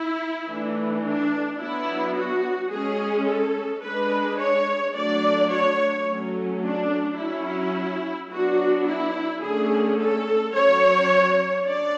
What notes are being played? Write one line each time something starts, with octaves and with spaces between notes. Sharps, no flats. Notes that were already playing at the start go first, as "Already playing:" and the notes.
Already playing: E4
E3 A3 D4
D4
F#3 B3 D4 E4
F#4
G#3 C#4 G#4
A4
G#3 D4 B4
C#5
F#3 A3 D4 D5
C#5
F#3 A3 C#4
D4
F#3 C#4 E4
F#3 B3 D4 F#4
E4
D3 A3 C#4 G#4
A4
F#3 C#4 C#5
D4 D5